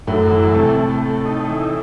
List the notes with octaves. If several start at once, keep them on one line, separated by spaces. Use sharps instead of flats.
F#2 A2
E3
C3 A3
A3
A3
D#4
E3